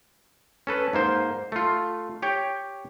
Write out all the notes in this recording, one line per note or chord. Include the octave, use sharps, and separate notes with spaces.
C#4 A4 B4
G#2 A#3 C5
A3 F4
G4 C#5 G5